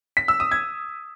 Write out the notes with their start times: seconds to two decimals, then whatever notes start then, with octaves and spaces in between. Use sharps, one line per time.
0.17 B6
0.28 E6
0.40 D#6
0.52 G#6